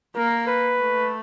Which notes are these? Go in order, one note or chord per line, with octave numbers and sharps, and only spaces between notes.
A#3 A#4
B4
A3